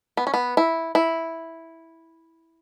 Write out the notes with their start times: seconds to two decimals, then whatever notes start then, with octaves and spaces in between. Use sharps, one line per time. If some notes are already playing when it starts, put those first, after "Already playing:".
0.17 B3
0.27 C#4
0.34 B3
0.57 E4
0.95 E4